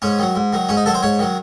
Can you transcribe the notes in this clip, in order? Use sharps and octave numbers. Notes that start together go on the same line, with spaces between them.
G#2 C#4
D#3 F#3
G#2
D#3 F#3
G#2 C#4
D#4
D#3 F#3 A4
C5
G#2 C#5
D#3 F#3